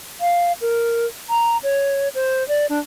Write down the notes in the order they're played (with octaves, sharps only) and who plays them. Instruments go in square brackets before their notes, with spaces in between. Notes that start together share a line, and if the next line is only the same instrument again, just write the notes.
[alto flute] F5
A#4
A#5
C#5
C5
D5
D4